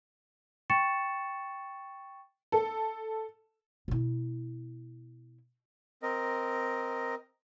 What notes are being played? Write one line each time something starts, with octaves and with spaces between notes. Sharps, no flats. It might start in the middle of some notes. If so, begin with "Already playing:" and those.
G5 C#6 A6 C#7 E7
A4
B2 E4
C4 A#4 D#5